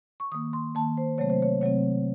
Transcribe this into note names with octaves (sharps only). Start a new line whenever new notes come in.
C#6
D#3 A#3 D#6
C6
D#3 A#3 A5
C5
C3 F#3 A3 C4 C#5
C5
C#5
C3 F#3 A3 C4 C#5